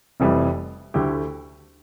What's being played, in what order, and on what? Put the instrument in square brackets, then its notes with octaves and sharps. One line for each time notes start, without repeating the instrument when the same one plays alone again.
[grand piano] F1 F2 E3 G3
D2 D3 A3 E4 G4